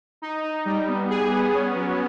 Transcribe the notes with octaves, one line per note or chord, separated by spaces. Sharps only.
D#4
D#4
G3
B3
G#4
B3
C#4
F#3